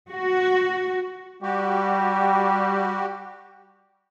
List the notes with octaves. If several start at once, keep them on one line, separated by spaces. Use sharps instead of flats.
F#4
G3 F#4 G4